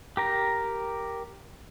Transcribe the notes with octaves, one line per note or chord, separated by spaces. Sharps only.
G4 A#4 A#5